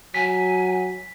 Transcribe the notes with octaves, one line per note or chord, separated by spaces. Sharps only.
F#3 G#5 B6